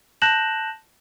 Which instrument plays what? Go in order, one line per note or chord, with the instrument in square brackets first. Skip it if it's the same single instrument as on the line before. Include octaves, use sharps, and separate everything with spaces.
[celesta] A5 F#6 G6 A#6 E7 F#7